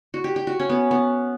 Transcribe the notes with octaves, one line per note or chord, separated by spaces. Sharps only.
F#4
G4
G4
F#4
C#4
B3
B3